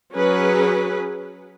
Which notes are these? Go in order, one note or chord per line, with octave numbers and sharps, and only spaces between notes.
F#3 C#4 G#4 B4